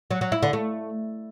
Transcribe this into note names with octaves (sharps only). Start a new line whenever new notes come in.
F#3
F#3
E4
D3
A3